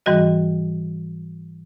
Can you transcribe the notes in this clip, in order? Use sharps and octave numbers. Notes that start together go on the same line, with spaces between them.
G#2 E3 G3 F#4 D#5